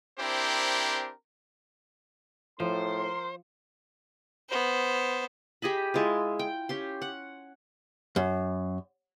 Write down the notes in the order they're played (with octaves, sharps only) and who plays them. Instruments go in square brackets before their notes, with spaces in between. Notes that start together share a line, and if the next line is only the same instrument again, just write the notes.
[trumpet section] C4 D4 E4 G4 A#4 C5
[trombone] A2 [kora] F3 [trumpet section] A#4 C6 [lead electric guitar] C5
[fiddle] B3 C5
[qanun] G4 G#4 D#5 B5
G#3 E4 F4
G5
C#4 G4 C6
F#5
[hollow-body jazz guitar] F#2